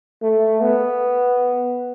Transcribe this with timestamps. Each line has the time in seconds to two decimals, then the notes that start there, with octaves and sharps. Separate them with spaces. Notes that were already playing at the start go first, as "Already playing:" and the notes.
0.22 A3
0.61 B3